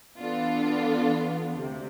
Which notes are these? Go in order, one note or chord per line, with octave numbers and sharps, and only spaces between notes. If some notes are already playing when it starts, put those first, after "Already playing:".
E3 B3 D4 F4 A4
D2 C3